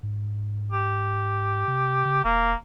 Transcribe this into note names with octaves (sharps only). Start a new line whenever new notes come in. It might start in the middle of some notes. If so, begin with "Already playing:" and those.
G#2
G4
C3
C#3
E1 A#3